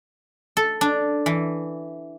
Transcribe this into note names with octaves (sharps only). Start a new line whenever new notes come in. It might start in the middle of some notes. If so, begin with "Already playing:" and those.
A4
D4
E3